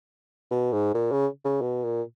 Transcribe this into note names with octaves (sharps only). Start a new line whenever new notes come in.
B2
G#2
A#2
C#3
C#3
B2
A#2